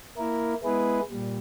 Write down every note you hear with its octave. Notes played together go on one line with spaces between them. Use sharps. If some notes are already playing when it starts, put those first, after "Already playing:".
A#3 E4 A#4
G#3 B3 E4 G#4 B4
A#2 G3